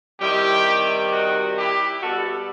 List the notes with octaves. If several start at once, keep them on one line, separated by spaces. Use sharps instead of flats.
C3 D#3 G3 E4 G4
D#4 F#4
E4 G4
B2 G3 F#4 A4